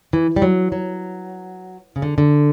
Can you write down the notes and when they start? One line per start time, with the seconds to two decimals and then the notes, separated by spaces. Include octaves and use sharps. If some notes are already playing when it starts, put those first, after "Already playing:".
0.13 E3
0.36 G3
0.42 F#3
0.72 F#3
1.96 C#3
2.02 D3
2.18 D3